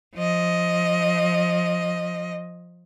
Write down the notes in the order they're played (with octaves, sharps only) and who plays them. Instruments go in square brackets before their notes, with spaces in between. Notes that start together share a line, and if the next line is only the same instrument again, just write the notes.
[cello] F3 D#5